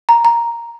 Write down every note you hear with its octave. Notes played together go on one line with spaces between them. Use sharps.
A#5
A#5